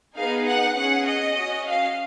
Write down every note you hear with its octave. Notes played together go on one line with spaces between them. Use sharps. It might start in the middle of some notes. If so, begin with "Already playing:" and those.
B3 D#4 G#4 F5
F#5
C#4 G#4 F#5
D#5
C#4 F#4
F5